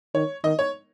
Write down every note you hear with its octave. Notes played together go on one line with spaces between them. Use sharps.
D#3 C#5
D#3 D#5
C#5